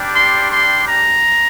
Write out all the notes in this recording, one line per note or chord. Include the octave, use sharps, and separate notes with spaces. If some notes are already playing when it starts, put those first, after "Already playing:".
Already playing: G3 D4 G4
C6
C6
A#5